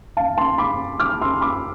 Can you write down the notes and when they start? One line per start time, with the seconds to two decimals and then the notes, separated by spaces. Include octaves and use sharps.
0.17 F5 A5
0.37 A5 C6
0.58 B5 D6
1.00 D6 F6
1.22 C6 E6
1.41 B5 D6